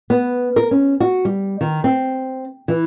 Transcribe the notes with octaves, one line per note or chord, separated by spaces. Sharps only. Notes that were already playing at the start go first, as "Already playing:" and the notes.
B3
A#4
C#4
F#4
G3
D#3
C4
E3